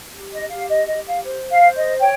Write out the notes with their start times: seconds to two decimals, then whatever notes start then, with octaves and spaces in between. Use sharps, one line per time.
0.13 G4
0.32 D#5
0.50 G4 F5
0.69 D#5
0.87 G4 D#5
1.07 F5
1.25 C5
1.50 F5
1.62 C5
1.75 D#5
1.99 C#5 G5